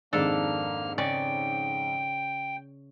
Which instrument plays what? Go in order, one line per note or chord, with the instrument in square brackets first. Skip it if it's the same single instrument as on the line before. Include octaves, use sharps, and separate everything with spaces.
[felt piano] F2 G#2 D#3 [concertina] A#3 F6 [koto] D4 A4
[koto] C#3 D5 [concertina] G5